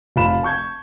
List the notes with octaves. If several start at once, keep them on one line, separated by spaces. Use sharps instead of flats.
F1 F4 B5 E7
A5 C#6 G6 G#6